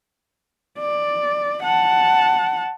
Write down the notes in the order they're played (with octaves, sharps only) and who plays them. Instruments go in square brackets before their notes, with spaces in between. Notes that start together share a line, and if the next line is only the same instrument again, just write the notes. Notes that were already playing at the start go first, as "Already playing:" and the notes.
[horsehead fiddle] D5
F#5 A5